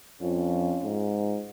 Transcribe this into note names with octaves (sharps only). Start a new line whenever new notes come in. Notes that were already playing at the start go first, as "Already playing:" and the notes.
F2 C#4 F4
G#2